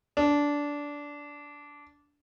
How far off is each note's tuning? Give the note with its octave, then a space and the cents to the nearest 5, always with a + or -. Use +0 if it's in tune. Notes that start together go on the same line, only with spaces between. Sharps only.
D4 -15